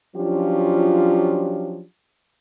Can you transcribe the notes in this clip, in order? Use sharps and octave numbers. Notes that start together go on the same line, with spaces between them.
F3 F#3 C#4 D4 F4 G4